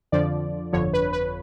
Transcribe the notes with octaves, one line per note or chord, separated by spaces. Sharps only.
F2 D3 F3 D5
G1 F2 D3 F3 C#5
B4
B4